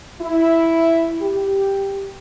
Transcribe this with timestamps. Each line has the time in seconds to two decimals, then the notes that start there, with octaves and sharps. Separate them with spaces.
0.21 E4
1.21 G4